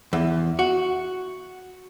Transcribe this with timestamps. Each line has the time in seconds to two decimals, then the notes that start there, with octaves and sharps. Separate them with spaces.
0.13 E2
0.59 F#4